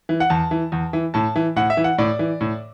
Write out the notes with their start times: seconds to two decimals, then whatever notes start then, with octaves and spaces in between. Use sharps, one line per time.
0.09 E3
0.20 F#5
0.30 E2 A5
0.51 E3
0.72 E2
0.93 E3
1.14 A2 A5
1.36 E3
1.56 A2 F#5
1.70 E5
1.77 E3
1.84 F#5
1.98 A2 D5
2.19 E3
2.41 A2